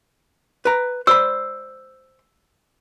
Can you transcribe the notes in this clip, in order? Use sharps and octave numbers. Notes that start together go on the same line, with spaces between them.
B4 A#5
C5 D5 B5 E6